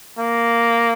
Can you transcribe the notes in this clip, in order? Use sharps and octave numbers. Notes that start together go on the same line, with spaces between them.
A#3